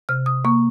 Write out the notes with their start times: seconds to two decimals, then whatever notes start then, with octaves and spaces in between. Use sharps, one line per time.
0.09 C3 F6
0.26 D#6
0.45 A#3 C#6